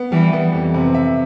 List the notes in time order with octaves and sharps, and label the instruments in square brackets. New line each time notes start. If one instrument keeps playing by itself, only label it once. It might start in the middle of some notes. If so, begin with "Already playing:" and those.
Already playing: [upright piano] B3
[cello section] E3 [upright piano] G3
[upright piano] B3
F2
C3
E5